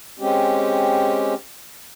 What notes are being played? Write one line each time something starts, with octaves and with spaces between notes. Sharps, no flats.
G#3 C4 C#4 G4